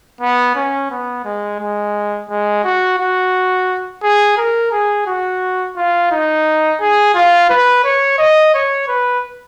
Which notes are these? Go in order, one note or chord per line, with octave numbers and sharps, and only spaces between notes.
B3
C#4
B3
G#3
G#3
G#3
F#4
F#4
G#4
A#4
G#4
F#4
F4
D#4
G#4
F4
B4
C#5
D#5
C#5
B4